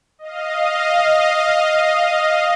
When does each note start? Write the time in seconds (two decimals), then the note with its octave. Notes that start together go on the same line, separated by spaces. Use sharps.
0.19 D#5 F5